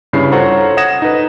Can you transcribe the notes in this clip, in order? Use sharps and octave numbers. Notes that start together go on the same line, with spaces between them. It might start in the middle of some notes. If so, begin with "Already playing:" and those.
G2 C#3 E4 C7
F4 A4 C5 C#5 F#5 A#5
F#5 D#6 G#6 A#6 E7
D#4 B4